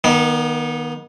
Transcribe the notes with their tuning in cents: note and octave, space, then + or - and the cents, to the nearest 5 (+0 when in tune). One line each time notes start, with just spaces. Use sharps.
D#3 +0 B3 -35